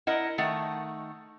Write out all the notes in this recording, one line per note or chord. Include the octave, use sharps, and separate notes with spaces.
E4 A#4 D#5 F#5
D#3 A3 F#5